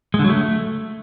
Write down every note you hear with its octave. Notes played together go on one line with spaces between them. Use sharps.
G#3
D3
F#3
A3